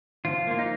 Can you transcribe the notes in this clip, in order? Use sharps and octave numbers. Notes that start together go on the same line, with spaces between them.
F3 F4
A#3 F4
D#4